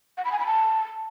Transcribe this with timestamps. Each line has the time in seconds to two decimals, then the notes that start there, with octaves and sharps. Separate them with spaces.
0.18 F#5
0.25 B5
0.32 G#5
0.39 B5
0.46 A5